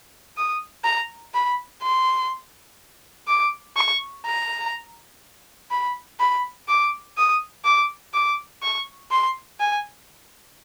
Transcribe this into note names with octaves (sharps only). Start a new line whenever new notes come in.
D#6
A#5
B5
C6
D6
C#6
A#5
B5
B5
D6
D#6
D6
D6
C#6
C6
G#5